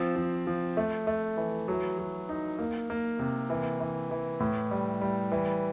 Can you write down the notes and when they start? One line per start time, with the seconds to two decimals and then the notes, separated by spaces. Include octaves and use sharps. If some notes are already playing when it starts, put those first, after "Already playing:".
Already playing: F3 C4
0.16 F3
0.47 F3
0.77 A3
1.07 A3
1.37 E3
1.68 F#3
1.99 F#3
2.29 D#4
2.58 A#3
2.90 A#3
3.19 C3
3.50 E3
3.80 E3
4.11 E3
4.40 A2
4.71 G3
5.01 G3
5.32 E3